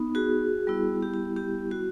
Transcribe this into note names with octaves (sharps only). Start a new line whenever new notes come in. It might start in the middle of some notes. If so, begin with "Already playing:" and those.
Already playing: B3 D#4
F#4 G#4
G3 B3 E4
G4
G4
G4
F#4